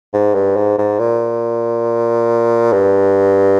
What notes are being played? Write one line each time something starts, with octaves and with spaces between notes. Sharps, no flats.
G#2
G2
G#2
G#2
A#2
G2